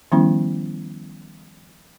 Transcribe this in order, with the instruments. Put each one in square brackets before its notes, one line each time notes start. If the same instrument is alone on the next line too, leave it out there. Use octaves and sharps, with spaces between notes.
[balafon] D#3 F3 G3 B3 C#4 E4